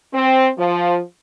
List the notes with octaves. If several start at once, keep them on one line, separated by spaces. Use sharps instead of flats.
C4
F3